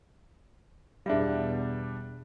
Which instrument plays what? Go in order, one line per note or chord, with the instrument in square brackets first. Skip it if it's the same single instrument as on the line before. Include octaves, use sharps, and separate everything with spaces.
[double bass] E2 B2 [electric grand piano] G3 D4 [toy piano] G#4 E5 F5